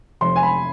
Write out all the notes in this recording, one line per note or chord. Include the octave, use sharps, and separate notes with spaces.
F1 C6
G#5
B5